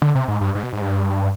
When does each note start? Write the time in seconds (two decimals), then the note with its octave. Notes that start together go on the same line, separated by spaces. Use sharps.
0.02 D3
0.15 C3
0.28 G#2
0.41 G2
0.55 G#2
0.63 B2
0.73 G#2
0.82 G2